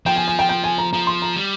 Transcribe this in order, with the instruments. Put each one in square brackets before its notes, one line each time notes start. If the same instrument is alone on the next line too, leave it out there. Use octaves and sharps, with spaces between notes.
[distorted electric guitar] F3 [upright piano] G5
[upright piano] G#5
G#5
G5
G5
G#5
A#5
[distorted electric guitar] F3 [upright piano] A#5
[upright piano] C6
A#5
[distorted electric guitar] G3